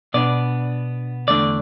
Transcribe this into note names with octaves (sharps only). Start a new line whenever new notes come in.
B2 B3 D4 D5
E2 D3 A3 D4 D5